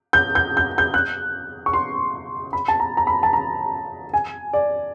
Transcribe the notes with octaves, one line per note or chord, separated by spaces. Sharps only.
G6
G6
G6
G6
F#6
C#6
C6
B5
A5
A#5
A#5
B5
A5
A#5
G#5
D5